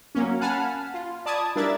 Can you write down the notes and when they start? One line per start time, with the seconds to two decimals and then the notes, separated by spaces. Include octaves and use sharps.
0.15 F#3 A#3 C#4
0.40 F5 F#5 G#5 A5 B5 F6
0.94 F4
1.26 D5 A5 B5 D#6 G#6
1.56 G3 D4 E4 A#4 E5 A6